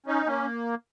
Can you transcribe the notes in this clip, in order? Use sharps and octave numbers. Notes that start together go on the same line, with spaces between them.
C#4 D#4
A#3 C#4